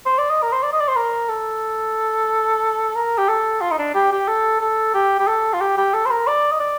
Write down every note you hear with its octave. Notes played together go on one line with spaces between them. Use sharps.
C5
D5
D#5
A#4
C5
D5
D#5
D5
C5
A#4
A4
A#4
G4
A4
F4
D#4
D4
G4
G4
A4
A4
G4
G4
A4
F4
G4
G4
A4
C5
A#4
D5
D#5
D5